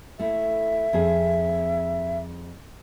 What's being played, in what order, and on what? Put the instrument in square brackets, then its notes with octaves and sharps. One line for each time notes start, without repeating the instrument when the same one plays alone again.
[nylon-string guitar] A3 E4 [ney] E5
[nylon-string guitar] F2 C4 G#4